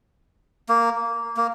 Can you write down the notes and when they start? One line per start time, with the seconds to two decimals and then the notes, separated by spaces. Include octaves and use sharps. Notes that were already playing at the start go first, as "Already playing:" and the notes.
0.69 A#3
1.37 A#3